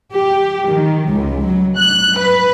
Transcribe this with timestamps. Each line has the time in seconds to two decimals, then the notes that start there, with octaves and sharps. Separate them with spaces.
0.12 G4
0.67 D#3
1.09 C#2
1.45 F#3
1.76 F#6
2.18 B4